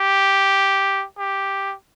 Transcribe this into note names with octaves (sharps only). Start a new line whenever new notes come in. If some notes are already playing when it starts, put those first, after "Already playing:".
Already playing: G4
G4